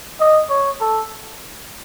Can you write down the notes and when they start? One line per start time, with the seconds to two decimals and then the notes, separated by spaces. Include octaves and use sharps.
0.20 D#5
0.50 C#5
0.80 A4